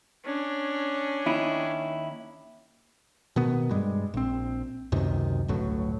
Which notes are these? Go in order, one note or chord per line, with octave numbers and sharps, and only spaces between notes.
C#4 D4
D#2 D#4 E4
B2 D#3 B3
G2 G3 G#3
A#1 C4
C#2 F#2 C3 D#3
G1 C#2 A2 F#3